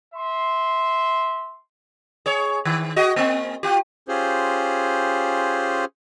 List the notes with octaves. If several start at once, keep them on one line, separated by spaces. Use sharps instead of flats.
E5 C6
G#4 C#5
D#3
F#4 G#4 D#5
A#3 C4
F4 G4
C#4 F4 G4 G#4 C5